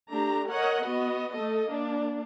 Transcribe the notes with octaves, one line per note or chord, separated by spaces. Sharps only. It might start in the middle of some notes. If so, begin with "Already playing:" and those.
A3 D4 G4 A#5
A#4 C#5 D#5 F#5
B3 F#4 D#5
A3 A4 D#5
A#3 D4